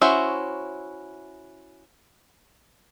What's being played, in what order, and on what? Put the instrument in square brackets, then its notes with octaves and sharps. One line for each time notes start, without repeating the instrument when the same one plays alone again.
[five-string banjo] C#4 E4 F#4 C5 E5